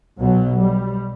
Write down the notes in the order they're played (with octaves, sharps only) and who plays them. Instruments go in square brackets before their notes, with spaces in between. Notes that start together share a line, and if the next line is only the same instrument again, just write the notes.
[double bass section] B1 B2 F#3
G3